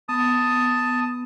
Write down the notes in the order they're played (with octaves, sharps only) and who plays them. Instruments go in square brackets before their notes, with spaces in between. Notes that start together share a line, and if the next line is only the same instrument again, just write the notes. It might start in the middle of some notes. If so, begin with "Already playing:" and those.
[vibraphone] B3 [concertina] A5 D#6